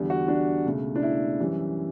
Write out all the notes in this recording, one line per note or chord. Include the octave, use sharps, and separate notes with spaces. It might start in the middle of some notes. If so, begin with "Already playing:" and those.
Already playing: E2 D3 G3
F#4
D4
C#2 B2 A3
D4
E4
F#2 E3 G3